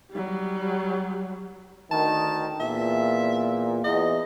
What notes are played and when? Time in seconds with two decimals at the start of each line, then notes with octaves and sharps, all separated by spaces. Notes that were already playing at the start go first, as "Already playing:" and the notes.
0.11 F#3 G3
1.92 D2 D#3 A5
2.60 E2 A#2 E5
3.84 E2 D#5